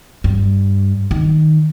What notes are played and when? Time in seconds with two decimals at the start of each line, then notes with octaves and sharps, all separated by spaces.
0.24 G2
1.11 D#3